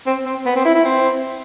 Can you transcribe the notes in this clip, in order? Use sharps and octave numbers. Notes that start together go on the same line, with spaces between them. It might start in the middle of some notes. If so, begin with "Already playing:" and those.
C4
C4
B3
C4
E4
E4
C4